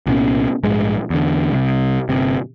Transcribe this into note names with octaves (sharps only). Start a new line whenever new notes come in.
C2 A#2 B3 C#4
A#1 G#2 G#3
E2 D3
C2 C3
G1 C3